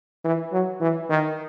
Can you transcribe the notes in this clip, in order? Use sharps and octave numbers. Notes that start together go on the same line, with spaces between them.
E3
F#3
E3
D#3